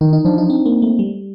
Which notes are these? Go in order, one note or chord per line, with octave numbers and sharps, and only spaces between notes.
D#3 D#4
D#4
F3 D4
D#4
C4
A#3
A3
G3